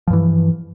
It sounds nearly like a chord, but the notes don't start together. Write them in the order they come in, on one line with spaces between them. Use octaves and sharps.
F3 G2 E3